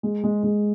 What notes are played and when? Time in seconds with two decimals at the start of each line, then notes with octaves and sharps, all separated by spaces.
0.03 G#3
0.24 G#3
0.43 G#3